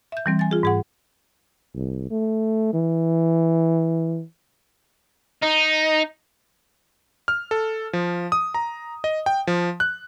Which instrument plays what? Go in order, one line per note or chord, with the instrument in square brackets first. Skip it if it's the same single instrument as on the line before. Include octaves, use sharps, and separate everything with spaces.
[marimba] E5 G6
E3 G3 C4
G#5 A6
F4 G#4
G#2 G#4 F#5
[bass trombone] C2
A3
E3
[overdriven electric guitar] D#4
[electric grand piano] F6
A4
F3
D#6
A#5
D#5
G5
F3
F#6